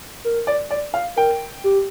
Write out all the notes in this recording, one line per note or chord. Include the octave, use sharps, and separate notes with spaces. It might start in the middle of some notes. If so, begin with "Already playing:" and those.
A#4
D5
D5
F5
A#4 G5
G4